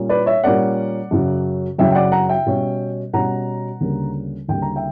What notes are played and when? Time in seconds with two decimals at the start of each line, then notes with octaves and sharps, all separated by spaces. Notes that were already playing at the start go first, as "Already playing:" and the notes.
Already playing: A#2 G3 A#3 C#4
0.09 B4 D5
0.26 C#5 E5
0.44 A#2 G3 A#3 C#4 D5 F#5
1.11 F#2 C#3 F#3
1.78 F#2 C#3 F#3 E5 G5
1.91 G5
1.95 D5 F#5
2.12 F#5 A#5
2.29 E5 G5
2.46 B2 G3 C#4
3.13 B2 G3 C#4 F#5 A#5
3.81 D2 C#3 G3 A#3
4.48 D2 C#3 G3 A#3 G5
4.62 A#5
4.76 E5 G5